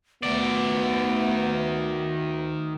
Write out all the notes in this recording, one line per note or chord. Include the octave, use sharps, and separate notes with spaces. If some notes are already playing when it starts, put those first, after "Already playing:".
D2 D#3 A3 B3 D5